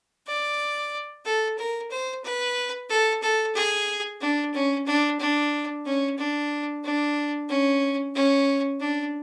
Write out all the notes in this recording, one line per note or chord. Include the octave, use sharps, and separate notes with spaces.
D5
A4
A#4
C5
B4
A4
A4
G#4
D4
C#4
D4
D4
C#4
D4
D4
C#4
C#4
D4